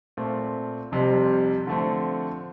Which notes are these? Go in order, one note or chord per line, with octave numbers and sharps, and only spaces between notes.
A#2 A3 C4
F1 F2 C3 G3 C4
D3 F3 A3 C4